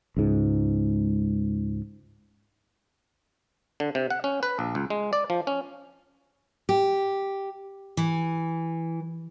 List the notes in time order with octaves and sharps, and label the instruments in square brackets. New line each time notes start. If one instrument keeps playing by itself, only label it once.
[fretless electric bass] C#2 G#2
[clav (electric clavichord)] D3
C3
F#5
C#4
B4
A#1
C#2
G#3
D5
F3
C#4
[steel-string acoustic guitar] G4
E3